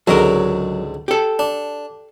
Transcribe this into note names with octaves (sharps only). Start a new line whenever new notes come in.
C#2 G#2 D3 F#3 A#4
G4 A4
D4